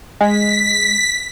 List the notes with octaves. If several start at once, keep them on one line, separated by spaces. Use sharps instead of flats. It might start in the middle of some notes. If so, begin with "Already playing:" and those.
G#3 B6